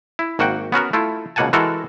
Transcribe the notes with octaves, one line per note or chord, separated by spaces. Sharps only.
E4
G#1 A#3 F#4 F#5 G5
B3 C#4 F#4 A#4
A3 E4 F4
C#2 B2 A#3 F#5 G#5 A5
E3 G#3 F#4 A4 A#4